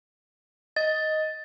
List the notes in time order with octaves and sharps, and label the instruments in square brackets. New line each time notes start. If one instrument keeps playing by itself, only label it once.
[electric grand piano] D#5 [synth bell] A6